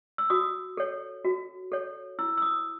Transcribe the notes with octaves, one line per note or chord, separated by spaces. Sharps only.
E6
F#4 D#6
A4 C#5
F#4
A4 C#5
E4 E6
E6
D#6